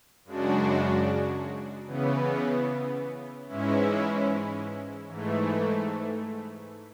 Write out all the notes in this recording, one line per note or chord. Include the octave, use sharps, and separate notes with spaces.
F#2 C#3 G#3 D4 F#4
C#3 E3 B3
G#2 E3 G#3 C#4 E4
G#2 E3 A3